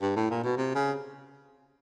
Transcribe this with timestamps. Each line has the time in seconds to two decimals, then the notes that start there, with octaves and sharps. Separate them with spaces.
0.02 G2
0.17 A2
0.30 A#2
0.44 B2
0.58 C3
0.75 C#3